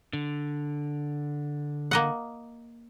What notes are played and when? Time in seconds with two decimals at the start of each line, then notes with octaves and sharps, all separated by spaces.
0.13 D3
1.91 A#3 D#5 F#5